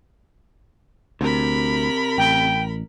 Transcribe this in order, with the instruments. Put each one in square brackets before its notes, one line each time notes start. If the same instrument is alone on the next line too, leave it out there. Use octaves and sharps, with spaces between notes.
[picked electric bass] D2 [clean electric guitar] C3 [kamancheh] A#4 B5
[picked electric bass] A1 [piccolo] G5